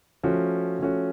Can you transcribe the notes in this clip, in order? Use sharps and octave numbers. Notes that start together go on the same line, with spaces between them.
F3 A3 C#4 F#4
F3 A3 C#4 F#4